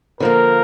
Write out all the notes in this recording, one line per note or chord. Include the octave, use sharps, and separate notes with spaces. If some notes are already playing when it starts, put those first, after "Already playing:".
D3 F3 A#3 A#4